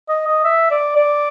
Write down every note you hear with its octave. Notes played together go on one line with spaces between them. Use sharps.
D#5
D#5
E5
D5
D5